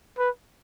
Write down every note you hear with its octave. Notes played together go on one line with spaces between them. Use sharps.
B4